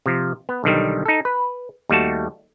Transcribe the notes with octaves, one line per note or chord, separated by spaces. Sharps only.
C3 F3
B3
B1 D3 D#3 G3
D#4 A4
B4
D#2 G3 A3 F#4 A5